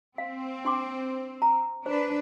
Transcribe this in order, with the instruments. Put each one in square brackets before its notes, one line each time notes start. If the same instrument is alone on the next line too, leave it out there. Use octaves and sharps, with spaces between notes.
[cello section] C4 [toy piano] F5
[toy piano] D4 C6 D6
A#5
[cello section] D4 B4 [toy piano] C5